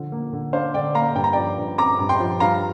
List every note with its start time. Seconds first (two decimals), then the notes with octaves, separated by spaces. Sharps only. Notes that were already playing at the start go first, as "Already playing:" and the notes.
Already playing: D3 F3
0.12 A#3
0.33 D3
0.53 D4 C5 F5
0.74 D3 D5 G5
0.95 A#3 F5 A#5
1.15 G2 G5
1.24 A#5
1.33 F3 D5 G5
1.58 G2
1.78 C4 A#5 D6
1.99 G2
2.09 G5 C6
2.20 F3
2.40 G2 F5 A#5